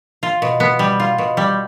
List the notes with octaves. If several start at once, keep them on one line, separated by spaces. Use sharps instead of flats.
F4
B2
B3
G3
F4
B2
G3